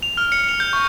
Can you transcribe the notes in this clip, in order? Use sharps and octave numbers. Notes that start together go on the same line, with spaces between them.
F7
F6
C#7
F7
G6
C#6